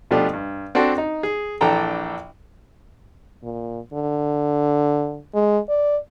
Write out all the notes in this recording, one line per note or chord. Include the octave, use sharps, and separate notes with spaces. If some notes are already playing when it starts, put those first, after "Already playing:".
B2 F3 A3 D4 G4
G2
C4 D4 F#4 A4
D#4
G#4
A#1 E3 D4 A4 G5 A#5
A#2
D3
G#3
D5